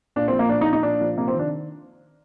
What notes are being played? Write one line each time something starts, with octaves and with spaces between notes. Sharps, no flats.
A#2 D4
C4
F3
A#3
A#2 D4
D#4
F3
D#4
A#2 D4
F3
C3 A#3
C4
D#3
D4